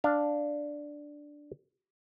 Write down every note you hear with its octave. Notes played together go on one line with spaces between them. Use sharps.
D4 F5